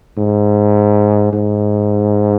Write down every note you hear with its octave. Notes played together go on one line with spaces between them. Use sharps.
G#2
G#2